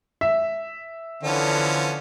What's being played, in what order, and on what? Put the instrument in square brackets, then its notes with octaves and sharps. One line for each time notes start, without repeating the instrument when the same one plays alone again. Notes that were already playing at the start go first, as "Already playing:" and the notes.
[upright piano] E5
[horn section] D3 [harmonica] E3 F3 C#4